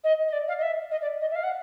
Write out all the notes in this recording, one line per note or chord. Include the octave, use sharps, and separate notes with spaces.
D#5
D#5
D5
F5
D#5
E5
D#5
D5
D#5
E5
F5
F#5